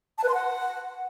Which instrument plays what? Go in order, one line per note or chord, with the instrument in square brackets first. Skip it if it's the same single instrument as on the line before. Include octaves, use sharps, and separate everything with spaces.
[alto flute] A5
B4
C6
F#5